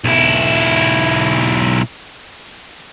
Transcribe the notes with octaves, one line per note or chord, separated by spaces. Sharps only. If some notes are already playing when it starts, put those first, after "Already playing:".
B1 E4